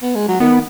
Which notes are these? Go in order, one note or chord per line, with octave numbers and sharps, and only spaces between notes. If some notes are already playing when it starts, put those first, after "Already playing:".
B3
G#3
F#3
D#3 B3